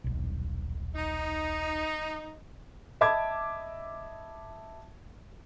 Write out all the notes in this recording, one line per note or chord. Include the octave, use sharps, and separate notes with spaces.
D#1 B1
D#4
D#5 E5 A5 B5 D6 G#6